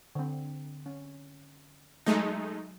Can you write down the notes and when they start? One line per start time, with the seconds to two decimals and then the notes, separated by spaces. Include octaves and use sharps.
0.15 D3 C4
0.86 C#4
2.06 F#3 G#3 A3 D#4